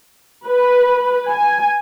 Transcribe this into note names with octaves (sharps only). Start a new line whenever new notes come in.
B4
G#5